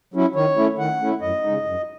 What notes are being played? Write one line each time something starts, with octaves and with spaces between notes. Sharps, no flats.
F#3 C#4 E4
D#3 C#5
A3 C#4 E4
D#3 F#5
A3 C#4 E4
F#2 D#5
C#3 G#3 D#4
F#2